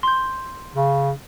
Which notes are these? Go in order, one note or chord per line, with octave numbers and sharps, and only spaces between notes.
C6 G6
C#3